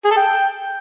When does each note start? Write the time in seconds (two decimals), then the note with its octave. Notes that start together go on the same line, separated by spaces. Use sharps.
0.05 G#4
0.11 A4
0.17 G5